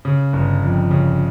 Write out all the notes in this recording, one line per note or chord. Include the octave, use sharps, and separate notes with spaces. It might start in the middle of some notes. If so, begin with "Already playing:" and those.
C#3
G1
F2
C#3